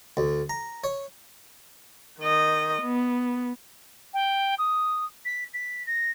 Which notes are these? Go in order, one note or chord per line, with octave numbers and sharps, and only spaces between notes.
D2
A#5
C#5
D#3 D#5
B3
G5
D#6
B6
B6
A#6